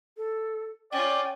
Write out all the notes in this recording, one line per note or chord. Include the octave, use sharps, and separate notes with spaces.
A4
C#4 F4 D5 G5